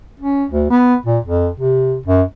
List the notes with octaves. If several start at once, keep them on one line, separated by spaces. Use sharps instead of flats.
C#4
D2
B3
A#2
F2
C3
F#2